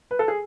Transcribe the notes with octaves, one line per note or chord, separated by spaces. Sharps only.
B4
A4
G#4